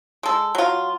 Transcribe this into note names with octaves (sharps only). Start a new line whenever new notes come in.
G#3 A4
F#3 F4